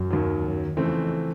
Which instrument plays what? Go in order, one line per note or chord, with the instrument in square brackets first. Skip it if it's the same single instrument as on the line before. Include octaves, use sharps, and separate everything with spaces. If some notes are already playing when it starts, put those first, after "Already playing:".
Already playing: [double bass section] F#2
[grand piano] D#2 D#3 F#3
[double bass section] F#2
[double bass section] F2 [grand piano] C#3 E3 A3 C4